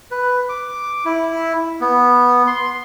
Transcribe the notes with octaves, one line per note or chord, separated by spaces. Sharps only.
B4
D6
E4
B3
C6